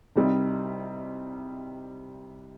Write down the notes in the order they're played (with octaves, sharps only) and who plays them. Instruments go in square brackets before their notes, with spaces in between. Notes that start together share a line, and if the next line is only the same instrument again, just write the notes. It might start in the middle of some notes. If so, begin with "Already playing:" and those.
[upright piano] C2 C3 G3 D#4